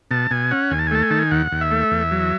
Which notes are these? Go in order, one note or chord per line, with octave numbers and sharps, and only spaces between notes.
B2 A5
B2 G#5
C#4 F#5
D#2 G#5
A5
G#5
A3 A5
G#5
D#3 A5
G#5
D#2 F#5
D#2
E5
A3
E2
F#3